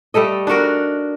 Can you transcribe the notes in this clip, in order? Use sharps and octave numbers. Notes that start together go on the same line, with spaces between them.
G3 A3 A4 D#5
D4 D#4 F#4 A#4